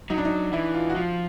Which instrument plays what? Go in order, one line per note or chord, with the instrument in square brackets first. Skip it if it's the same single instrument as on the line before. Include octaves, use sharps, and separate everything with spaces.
[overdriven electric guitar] F#3 [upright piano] D#4
[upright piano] D4
D#4
[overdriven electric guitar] E3 [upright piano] E4
[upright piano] F4
F#4
[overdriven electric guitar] F3 [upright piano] F4